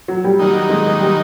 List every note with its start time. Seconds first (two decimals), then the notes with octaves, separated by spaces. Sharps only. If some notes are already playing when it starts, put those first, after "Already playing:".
0.08 F#3
0.24 G3
0.39 D#3 F#3 G3 A#3 D#4
0.70 G#3
1.00 G3